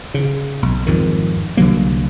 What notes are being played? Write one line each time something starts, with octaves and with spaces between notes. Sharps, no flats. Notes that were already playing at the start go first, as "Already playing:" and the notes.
C#3
B1
F2 G#2 D#3
C2 D3 F#3 A#3